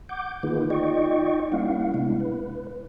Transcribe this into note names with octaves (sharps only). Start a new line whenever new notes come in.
F#5 D6 G6
D#3 A#3 D#4 F4 G#4 B4
D#4 F4 D5 D#5 G5 C#6
G3 A#3 C#4 E4 F5 F#5
C3 G#3 B3 D4 E4
B4